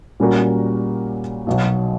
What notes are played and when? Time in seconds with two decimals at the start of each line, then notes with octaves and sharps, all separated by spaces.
0.20 A#2 G3 C#4 F#4 A#4
1.47 B1 B2 F#3